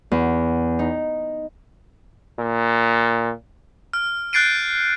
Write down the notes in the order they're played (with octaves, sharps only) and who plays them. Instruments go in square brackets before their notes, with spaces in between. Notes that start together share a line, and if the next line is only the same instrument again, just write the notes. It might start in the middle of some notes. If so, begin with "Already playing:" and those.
[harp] E2
D#4
[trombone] A#2
[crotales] F6
F#6 G6 A6 C7 D7 D#7